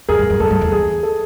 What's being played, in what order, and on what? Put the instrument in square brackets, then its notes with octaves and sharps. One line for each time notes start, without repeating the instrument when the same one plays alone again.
[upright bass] F2 [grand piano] G#4 A#4
[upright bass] G2
F#2
[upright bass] F#2 [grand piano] A4
[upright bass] G2
E2
[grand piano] G#4
A4